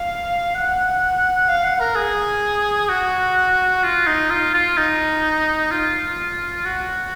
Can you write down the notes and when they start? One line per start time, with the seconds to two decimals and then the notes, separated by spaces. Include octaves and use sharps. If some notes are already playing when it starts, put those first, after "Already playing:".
Already playing: F5
0.55 F#5
1.49 F5
1.65 F#5
1.80 A#4
1.95 G#4
2.90 F#4
3.83 F4
4.07 D#4
4.30 F4
4.54 F4
4.77 D#4
5.71 F4
6.65 F#4